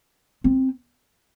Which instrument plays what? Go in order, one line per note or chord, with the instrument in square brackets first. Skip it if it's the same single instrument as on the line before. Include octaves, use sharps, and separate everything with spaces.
[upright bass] C4